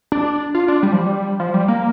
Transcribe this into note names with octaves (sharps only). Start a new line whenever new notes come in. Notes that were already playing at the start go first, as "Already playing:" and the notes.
D4
F4
D4
G3
F3
G3
F3
G3
A#3